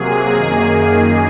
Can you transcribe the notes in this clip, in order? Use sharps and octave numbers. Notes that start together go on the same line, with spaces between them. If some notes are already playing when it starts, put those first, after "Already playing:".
Already playing: C3 F#3 A#3 G#4
F#2 D#3 A#3